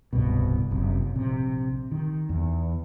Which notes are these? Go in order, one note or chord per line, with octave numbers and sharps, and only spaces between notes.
D1 C2 G2 B2
F#1 C3
A#1 C3
D#3
E2